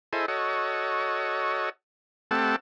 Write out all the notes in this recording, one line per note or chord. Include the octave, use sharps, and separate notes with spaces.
E4 G#4 A4 C5 D#5
F#4 A4 C#5 D#5
A3 C4 G4 A4 F#5 A5